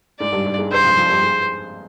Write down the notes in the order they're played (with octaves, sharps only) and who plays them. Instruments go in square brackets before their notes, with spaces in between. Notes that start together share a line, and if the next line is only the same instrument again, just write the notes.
[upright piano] G#2 G#3 [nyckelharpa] D5
[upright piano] G2 G3
G2 G3
G#2 G#3
[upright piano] G2 G3 [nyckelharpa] C5
[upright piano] F2 F3
F2 F3
G2 G3
G#2 G#3